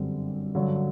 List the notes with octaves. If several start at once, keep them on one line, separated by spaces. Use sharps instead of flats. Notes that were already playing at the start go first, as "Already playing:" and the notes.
Already playing: G1 F#2 D3 G3 C4
G2 D3 F#3